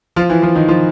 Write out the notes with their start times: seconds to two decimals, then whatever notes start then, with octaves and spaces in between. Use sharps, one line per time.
0.16 F3 F4
0.29 E3 E4
0.42 F3 F4
0.56 D#3 D#4
0.68 F3 F4